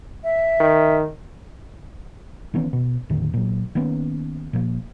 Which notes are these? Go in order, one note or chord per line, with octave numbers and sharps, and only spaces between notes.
E5
D#3
D#3 E3 B3 C#4
B2
E2 A2 D3 D#3
A#2 F#3
D#3 A#3 B3 C#4
A#2 F3 A#3